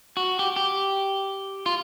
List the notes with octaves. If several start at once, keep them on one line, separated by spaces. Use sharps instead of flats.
F#4
G4
G4
F4